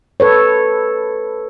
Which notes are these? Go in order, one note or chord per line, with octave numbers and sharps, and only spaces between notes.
A4 B4 C#5